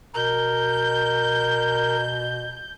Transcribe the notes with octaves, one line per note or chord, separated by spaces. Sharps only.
B2 A#4 G6